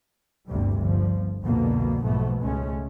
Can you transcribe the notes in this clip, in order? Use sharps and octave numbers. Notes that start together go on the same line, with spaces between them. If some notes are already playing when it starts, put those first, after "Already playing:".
G1 D2 G2 C3 G3
G1 F3
C2 F2 B2 D3 A#3 B3
B1 G#2 B2 F3 A3 B3
C#2 G#3 A3 C#4